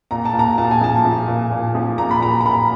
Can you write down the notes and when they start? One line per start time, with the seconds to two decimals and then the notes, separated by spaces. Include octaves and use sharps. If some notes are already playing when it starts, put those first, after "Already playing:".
0.11 A#2 A#5
0.25 A5
0.34 A#2
0.39 A#5
0.58 A#2 A5
0.71 G#5
0.81 F3 A5
1.05 F3
1.28 A#2
1.51 A#2
1.75 F3
1.98 A#2 A#5
2.11 B5
2.22 A#2 A#5
2.41 A#5
2.46 A#2 B5